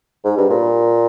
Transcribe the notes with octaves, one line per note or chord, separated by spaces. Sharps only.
G#2
G2
A#2